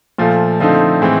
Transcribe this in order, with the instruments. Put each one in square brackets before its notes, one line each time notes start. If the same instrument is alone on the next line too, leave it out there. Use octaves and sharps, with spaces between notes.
[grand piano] A#2 F3 A3
D3 F3 A3 C4 D#4
A2 E3 G#3 C4